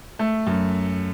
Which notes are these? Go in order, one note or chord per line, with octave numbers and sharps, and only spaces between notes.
A3
F#2